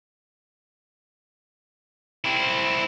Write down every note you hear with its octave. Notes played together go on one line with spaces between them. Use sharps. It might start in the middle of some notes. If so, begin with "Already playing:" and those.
C4 E4